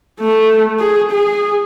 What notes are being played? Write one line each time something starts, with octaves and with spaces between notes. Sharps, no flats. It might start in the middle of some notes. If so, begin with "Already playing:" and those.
A3
G#4
G#4